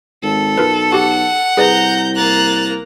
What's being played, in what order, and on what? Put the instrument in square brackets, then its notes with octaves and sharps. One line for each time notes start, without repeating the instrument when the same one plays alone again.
[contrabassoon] G#1 [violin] A4
[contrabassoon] B1 [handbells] F4 A#4 B4
[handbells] F#4 G4 [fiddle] F#5
[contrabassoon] C2 [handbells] G#4 B4 D5 [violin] A#5 G6
[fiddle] A#3 A#5 [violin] F#6 A6